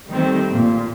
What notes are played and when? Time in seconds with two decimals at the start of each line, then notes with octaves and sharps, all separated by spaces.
0.10 D#3 G3 A3 C4
0.49 A#2